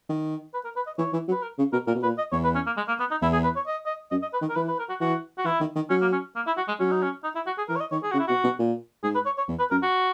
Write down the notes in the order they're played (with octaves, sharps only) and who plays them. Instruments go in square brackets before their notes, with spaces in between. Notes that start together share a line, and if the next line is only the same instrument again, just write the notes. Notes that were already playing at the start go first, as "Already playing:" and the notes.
[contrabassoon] D#3
[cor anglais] B4
A#4
B4
D#5
[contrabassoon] E3 [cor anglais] C#5
[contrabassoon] E3
F#3
[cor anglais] B4
A#4
[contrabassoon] C#3
[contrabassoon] B2 [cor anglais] A#4
[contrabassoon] A#2 [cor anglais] A#4
[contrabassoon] B2
[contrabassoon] A#2 [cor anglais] B4
[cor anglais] D#5
[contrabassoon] E2 [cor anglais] C#5
[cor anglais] B4
C#4
A#3
G#3
A#3
B3
D#4
[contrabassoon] E2 [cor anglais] E4
[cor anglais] G#4
B4
C#5
D#5
D#5
[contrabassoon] F#2 [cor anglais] D#5
[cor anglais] D#5
B4
[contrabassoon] D#3
[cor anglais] A#4
[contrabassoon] E3 [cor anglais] B4
[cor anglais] B4
A#4
F#4
[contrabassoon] E3 [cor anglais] F#4
[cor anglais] F#4
[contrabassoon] E3 [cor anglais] E4
[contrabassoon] D#3
D#3
[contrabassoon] F#3 [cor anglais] C#4
[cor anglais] A#3
C#4
A#3
E4
F#4
G#3
[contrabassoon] F#3 [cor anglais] C#4
[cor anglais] D#4
C#4
D#4
E4
F#4
G#4
[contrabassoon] E3 [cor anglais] A#4
[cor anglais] C#5
D#5
[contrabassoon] D#3 [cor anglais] C#5
[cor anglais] G#4
[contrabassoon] C#3 [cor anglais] F#4
[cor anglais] E4
[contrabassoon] B2 [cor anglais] F#4
[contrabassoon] B2
A#2
[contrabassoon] G#2 [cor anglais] G#4
[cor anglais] B4
C#5
C#5
[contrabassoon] E2
[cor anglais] B4
[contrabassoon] F#2 [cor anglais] A#4
[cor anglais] F#4